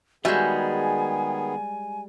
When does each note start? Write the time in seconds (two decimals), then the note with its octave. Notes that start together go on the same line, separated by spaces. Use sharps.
0.25 D#3 G3 G#3 B3 F#4 G#4 E5 G#5